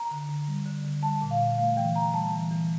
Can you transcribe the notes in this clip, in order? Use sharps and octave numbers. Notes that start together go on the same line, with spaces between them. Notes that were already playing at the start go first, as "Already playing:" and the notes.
Already playing: A#5
D3
D3
G3
D3
D3
G3 A5
A#2
F5
A#2
A3 F5
E3 G5
E3 A#5
G3 A5
E3
E3